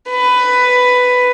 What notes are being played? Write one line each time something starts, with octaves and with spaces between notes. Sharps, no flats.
B4